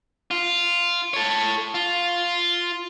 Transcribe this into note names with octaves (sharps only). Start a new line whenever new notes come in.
F4
A4 C#5
F4